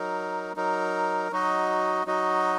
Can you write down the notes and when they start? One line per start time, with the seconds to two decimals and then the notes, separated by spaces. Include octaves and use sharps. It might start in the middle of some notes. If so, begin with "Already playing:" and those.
Already playing: F#3 D#4 A#4
0.56 F#3 D#4 A#4
1.32 F#3 D#4 F#4 D#5
2.06 F#3 D#4 F#4 D#5